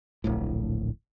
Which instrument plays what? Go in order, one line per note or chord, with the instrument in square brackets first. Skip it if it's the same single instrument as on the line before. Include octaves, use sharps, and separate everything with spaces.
[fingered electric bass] D1 A#1 A2